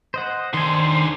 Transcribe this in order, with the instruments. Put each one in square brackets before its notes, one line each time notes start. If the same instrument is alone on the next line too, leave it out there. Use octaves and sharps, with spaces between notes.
[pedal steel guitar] C5 D#5 F#5
[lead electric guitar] D3 C5 [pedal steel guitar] D#3 G#5